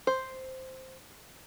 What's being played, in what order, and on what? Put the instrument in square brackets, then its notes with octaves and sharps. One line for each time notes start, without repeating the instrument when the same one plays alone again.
[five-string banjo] C5